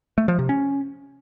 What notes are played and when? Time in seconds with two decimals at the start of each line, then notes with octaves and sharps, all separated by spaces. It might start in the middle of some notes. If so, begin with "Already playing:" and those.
0.18 A3
0.28 F3
0.39 C3
0.49 C#4